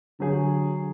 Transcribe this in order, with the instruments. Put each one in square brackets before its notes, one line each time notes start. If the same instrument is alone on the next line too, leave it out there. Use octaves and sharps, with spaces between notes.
[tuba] D3 [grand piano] F#3 G#4